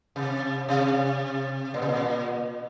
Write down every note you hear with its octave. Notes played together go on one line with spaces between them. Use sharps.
C3
C3
A#2
C3
A#2